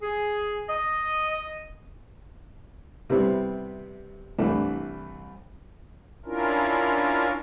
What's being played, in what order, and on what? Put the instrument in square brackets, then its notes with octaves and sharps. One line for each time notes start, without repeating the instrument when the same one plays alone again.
[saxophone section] G#4
D#5
[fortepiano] C3 G3 B3 C4 E4
C2 E3 A3 D4
[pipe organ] C#4 D4 E4 F4 A#4